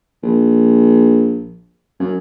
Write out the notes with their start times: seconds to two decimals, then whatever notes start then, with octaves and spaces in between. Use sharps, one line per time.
0.23 A#1
2.00 F#2